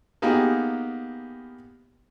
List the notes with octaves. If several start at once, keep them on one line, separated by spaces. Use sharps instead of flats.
A#3 B3 D#4 F4 G4 G#4